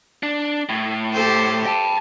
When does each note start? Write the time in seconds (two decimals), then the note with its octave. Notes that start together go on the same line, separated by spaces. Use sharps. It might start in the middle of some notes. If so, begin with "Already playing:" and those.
0.23 D4
0.69 A2
1.13 G4 A4 C5
1.66 G5 A5